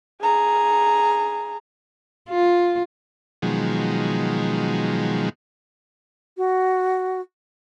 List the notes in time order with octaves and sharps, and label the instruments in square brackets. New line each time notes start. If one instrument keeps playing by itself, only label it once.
[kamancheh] G#4 A#5
[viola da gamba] F4
[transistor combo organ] B2 D#3 F3 F#3 G#3
[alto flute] F#4